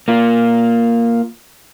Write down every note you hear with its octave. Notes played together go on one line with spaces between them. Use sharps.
A#3 F4